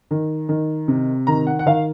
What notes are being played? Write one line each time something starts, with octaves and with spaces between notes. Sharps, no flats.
D#3
D#3
C3
D#3 A#5
F#5
F#5
D#3 F5